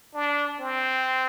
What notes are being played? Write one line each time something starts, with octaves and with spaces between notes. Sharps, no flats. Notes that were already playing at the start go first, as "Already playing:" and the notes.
D4
C4